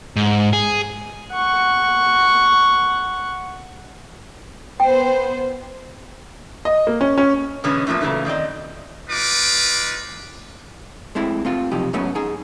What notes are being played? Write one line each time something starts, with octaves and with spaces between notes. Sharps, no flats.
G#2
G#4
F#5 C#6
B3 C5 G5
D#5
A#3
C#4
C#4
B2 D3 E3 G#3 B3 C#4
A2 E3 F3 A#3 C4
A#2 C#3 E3 F#3 A3
D#3 C4 D5 D#5
D#4 F4 B4 D6
G#3 A3 C4 E4
A3 C4 F4
B1 F2 C3 D#4 G4
G#2 F#3 A3 B3 C#4
D#4 G#4